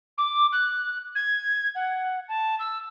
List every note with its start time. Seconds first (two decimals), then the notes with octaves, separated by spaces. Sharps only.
0.18 D6
0.52 F#6
1.15 G#6
1.75 F#5
2.28 A5
2.59 E6